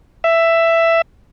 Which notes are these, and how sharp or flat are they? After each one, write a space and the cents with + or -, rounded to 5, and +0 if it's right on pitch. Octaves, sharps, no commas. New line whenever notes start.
E5 +10